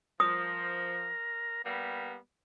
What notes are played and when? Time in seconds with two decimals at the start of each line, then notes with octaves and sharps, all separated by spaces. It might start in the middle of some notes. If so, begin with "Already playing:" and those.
0.20 F3 A#4 D#6
1.64 G3 A#3 B3